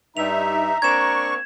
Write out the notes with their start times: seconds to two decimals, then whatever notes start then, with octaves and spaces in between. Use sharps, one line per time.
0.17 G2 G3 D#4 E5 A#5 F7
0.82 A#3 C4 D4 C#6 G#6 E7